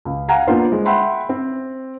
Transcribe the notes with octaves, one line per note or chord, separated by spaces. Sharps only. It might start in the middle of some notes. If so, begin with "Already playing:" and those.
C#2
F5 F#5 G#5 A#5
A#3 B3 D4 F4 C5
G#3
E5 F#5 G5 B5 C6
C4